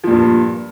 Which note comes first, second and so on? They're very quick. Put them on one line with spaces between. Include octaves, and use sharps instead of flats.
F3 A#2 G2